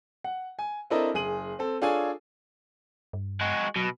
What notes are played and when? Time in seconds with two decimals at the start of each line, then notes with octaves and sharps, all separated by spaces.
0.24 F#5
0.59 G#5
0.90 C4 D4 E4 A4 A#4 D#5
1.14 F#1 G#4 D#7 F#7
1.59 C4 A4
1.82 D4 F4 G#4 A4 C#5 G#5
3.13 G2
3.41 G#3 F#4
3.76 B2 F#3